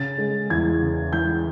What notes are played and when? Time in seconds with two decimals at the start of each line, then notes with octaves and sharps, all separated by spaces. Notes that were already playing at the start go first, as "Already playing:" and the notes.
Already playing: C#3 A6
0.18 G#3
0.50 E2 G#6
0.82 C#3
1.13 E3 G6